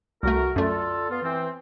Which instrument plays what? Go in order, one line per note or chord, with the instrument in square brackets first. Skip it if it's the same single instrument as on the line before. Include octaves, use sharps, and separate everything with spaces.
[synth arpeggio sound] C2 A3 [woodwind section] F#4 A#4
[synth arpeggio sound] F#2 A3 [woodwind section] D3 F4 A4
[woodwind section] B3 F4
E3 C4